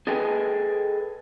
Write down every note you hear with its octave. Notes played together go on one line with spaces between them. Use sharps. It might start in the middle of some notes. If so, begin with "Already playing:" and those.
G#4 A4 B4 D#5 G5 G#5